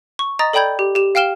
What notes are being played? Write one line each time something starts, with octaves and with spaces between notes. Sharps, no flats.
C#6
D#5 A#5 D#6 A6
A4 D5 G5 B5 G6 G#6
G4
G4 E7
F5 G5 F6 E7 G7